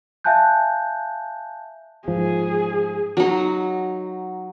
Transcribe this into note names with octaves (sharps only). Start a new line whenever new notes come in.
E5 F5 G#5 A5 F#6 G6
G#2 F3 G#4
F#3 D#4